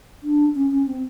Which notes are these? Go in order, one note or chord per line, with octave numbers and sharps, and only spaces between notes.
D4
C#4
C#4
C4